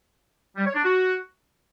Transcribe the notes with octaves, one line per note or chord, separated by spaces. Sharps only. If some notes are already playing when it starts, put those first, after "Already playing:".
G3
C#5
D4
F#4